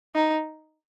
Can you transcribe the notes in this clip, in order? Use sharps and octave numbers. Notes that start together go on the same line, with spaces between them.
D#4